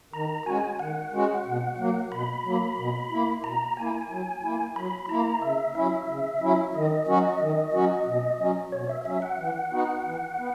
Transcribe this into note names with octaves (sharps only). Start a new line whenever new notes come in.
D#3 A#5
G#3 C#4 F#4 G#5
D#3 F#5
G#3 C#4 F#4
B2
F#3 A#3
B2 B5
F#3 A#3
B2
A#3 E4
B2 A#5
A#3 E4 G#5
F#3
A#3 E4
F#3 B5
A#3 E4 A#5
C#3 E5
F#3 C#4 E4 E5
C#3
F#3 C#4 E4
D#3 D#5
F#3 C#4 F#4
D#3
F#3 C#4 F#4
B2
F#3 C#4
B2 C#5
E5
F#3 C#4 E5
F#5
E3
B3 D#4 F#4
E3
B3